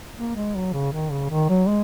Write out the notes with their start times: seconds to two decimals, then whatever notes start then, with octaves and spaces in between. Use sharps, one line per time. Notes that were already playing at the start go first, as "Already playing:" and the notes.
0.17 A#3
0.36 G#3
0.55 F#3
0.73 C#3
0.92 D#3
1.11 C#3
1.30 D#3
1.49 F#3
1.68 G#3